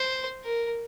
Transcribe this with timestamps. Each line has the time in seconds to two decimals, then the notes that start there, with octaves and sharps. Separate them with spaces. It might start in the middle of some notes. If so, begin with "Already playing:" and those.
Already playing: C5
0.45 A#4